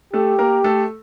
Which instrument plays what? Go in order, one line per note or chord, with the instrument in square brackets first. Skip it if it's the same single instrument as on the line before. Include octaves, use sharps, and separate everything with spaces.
[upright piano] A3 A4 [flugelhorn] G4
[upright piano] A#3 A#4
A3 A4